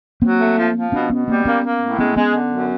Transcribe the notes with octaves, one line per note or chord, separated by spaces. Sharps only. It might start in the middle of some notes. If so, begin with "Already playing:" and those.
F#3 A#3 C4
A3
F3
F3
B2 C4 D4
B2 B3 C#4
G3 A#3 C4
A#3 B3 C#4
A#3
A2
G#3 B3 C#4
G#3 B3 C#4
D3
F#2